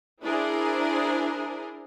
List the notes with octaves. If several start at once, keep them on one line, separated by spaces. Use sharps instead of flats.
D4 E4 G#4 A#4 C5